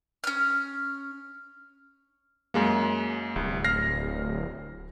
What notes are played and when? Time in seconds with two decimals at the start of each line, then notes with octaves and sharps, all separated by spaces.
0.24 C#4 F6
2.54 F#2 G#3 A#3
3.36 D1 C2
3.64 F6 A#6 C7